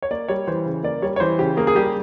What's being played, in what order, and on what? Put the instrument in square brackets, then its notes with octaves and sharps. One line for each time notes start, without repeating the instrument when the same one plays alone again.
[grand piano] C#5
A#3 D5
G3 C#5
E3 C5
C#3
A#3 D5
G3 C#5
C#5
E3 C5
C#3 G4
A#3 G#4
G#4
G3 G4